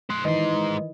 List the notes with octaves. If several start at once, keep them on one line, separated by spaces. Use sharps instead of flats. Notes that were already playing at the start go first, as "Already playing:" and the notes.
C5 F#5
G#2 D#3 E3 B4 D#5 C6